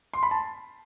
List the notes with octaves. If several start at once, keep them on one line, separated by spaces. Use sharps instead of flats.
C6
B5
A5